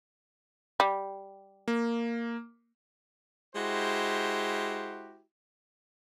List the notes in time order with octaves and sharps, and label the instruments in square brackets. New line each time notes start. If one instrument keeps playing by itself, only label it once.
[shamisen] G3
[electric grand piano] A#3
[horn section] G#3 E4 F#4 G4 C5